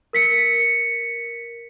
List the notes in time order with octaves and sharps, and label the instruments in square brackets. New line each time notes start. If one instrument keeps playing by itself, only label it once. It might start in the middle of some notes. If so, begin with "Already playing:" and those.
[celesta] A#4 B6 C#7